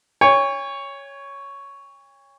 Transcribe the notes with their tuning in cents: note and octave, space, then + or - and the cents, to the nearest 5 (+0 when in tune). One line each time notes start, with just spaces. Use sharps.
C#5 +5 G#5 -45